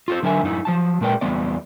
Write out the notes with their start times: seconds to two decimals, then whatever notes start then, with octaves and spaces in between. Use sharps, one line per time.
0.08 F4 A4 C5
0.23 D3 F#3 D#4 A#4 E5 G#5
0.43 F#2 D#4 E4
0.65 F3 F#3 A5
1.01 A#2 G#3 A#4 B4 D5 G5
1.21 E2 G3 B3 D5